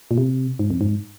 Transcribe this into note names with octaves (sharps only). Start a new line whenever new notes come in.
A#2
C3
G#2
F2
G#2